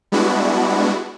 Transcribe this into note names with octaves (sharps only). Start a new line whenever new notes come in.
G3 G#3 B3 D4 E4 F#4